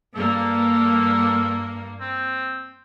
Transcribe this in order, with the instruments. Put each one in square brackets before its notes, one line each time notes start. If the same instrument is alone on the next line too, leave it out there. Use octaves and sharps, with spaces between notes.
[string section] G2 A#3 [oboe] A4
[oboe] C4